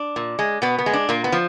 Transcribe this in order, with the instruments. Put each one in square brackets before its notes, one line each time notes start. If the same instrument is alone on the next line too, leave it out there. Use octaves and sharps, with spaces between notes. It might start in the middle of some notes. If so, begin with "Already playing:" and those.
Already playing: [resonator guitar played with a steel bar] D4
A#2
G#3
B2 B3
B3
G#3
D4
A#2 A#3
B3
F3